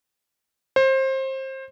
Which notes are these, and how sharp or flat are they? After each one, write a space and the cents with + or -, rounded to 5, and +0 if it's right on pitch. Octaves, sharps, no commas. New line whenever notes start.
C5 +25